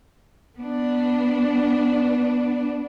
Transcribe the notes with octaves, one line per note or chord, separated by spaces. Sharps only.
B3 D4